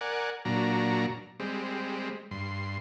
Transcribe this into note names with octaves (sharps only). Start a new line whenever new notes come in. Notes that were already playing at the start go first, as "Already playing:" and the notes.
A#4 D5 F#5 G#5
A#2 F#3 D4 A#5
G3 G#3 C4
G2 C6